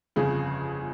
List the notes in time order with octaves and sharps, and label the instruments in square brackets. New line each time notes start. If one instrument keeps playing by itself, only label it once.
[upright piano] G1 F2 C#3 G#4